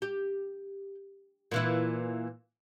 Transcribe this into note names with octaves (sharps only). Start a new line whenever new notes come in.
G4
A#2 E3 E4